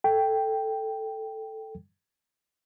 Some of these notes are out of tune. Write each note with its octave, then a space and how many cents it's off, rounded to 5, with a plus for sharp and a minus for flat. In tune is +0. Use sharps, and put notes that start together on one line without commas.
A4 +0 G5 +0